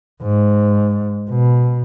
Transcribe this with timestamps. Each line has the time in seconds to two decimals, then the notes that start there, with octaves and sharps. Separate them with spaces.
0.22 G#2
1.30 B2